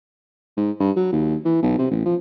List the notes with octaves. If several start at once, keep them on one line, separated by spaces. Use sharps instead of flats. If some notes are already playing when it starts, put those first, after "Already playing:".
G#2
G2
F#3
D#2
E3
B1
C3
A1
F3